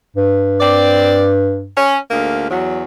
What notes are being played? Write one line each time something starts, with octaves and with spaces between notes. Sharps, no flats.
G2
C4 D5
C#4
D2 G#2 A#3
E2 F#3